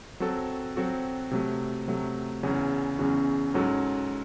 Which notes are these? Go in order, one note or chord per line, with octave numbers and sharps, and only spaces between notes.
F#3 C4 F#4 A4
F#3 C4 F#4 A4
C3 F#3 A3
C3 F#3 A3
E2 C#3 F#3 C#4 F#4
E2 C#3 F#3 C#4 F#4
G#2 F#3 C#4 F#4 A4